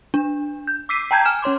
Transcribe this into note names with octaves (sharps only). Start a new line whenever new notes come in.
D4
G6
D6 E6 B6 C7 D#7
G5 A5 A#5 G6 G#6
G#5 F6 E7
C#4 C#5 C6 D6